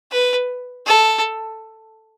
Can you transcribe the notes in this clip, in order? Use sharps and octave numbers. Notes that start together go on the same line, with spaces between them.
B4
A4